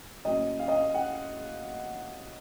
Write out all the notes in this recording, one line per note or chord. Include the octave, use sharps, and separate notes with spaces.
A2 F#3 A#3 C#4 D#5
F5
D#5
F5
F#5